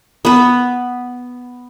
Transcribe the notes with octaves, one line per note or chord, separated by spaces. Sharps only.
B3 B4